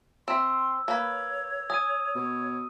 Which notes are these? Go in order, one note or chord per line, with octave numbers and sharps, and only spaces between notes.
C4 E5 C6 E6
A#3 B4 C#5
G#5 D#6 D#7
B2 C#5